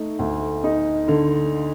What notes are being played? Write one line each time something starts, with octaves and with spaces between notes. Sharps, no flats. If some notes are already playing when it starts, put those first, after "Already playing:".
Already playing: A3 D#4
D2
D#4
D3